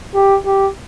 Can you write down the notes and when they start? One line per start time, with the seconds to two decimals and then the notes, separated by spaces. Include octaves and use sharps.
0.15 G4
0.46 G4